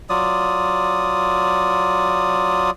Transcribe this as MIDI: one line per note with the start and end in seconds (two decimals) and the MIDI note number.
0.09 2.70 54
0.09 2.70 65
0.09 2.70 74
0.09 2.70 87